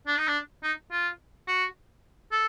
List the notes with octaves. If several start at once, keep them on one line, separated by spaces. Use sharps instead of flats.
D4
D#4
D4
D#4
F4
F#4
A4